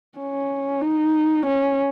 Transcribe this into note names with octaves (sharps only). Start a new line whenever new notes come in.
C#4
D#4
C#4